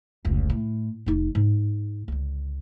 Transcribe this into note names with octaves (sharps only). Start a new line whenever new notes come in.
F1 C#2
A2
F1 D#4
G#2
C#2 D3